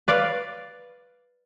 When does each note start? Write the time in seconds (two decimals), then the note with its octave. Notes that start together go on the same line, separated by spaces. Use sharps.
0.08 B4 D5 F5